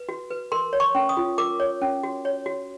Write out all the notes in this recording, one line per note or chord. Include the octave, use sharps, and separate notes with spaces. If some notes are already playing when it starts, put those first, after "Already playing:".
Already playing: B4
F#4
B4
A#4 C6
C#5
C#6
C#4
D#6
F4
A#4 D6
C#5
C#4
F#4
C#5
F#4